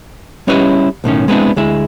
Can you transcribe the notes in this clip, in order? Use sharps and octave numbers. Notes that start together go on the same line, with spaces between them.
G3 C#4 E4 B4 C#5 D#5
B1 A2 D#3 C#4
G#3 B3 C4 D4 E4
D2 G#3 E4